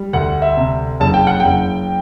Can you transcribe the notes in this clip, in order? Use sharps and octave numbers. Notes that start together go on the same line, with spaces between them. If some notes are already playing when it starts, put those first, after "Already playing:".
Already playing: G3
D2 F#5
E5
C3
F#1 A5
G5
F#5
F#1 G5